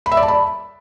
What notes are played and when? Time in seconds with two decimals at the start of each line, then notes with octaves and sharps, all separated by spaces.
0.06 B5
0.12 E5
0.17 D5
0.23 A5
0.28 B5